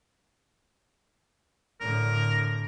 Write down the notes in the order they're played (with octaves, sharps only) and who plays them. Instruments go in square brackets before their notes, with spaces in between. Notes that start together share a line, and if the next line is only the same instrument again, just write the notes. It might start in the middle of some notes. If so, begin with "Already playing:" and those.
[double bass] A2 D3 [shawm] A#4